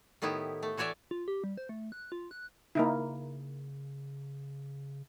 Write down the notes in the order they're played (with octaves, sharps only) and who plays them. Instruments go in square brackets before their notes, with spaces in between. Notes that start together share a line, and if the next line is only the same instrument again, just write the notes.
[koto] A2 D#3 B3 E4 G4
A3
E3 F#4 C#5 D5 E5
[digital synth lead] F4
G4
G3
C5
A3
F#6
F4
F#6
[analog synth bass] C#3 [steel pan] A#3 D#4 E4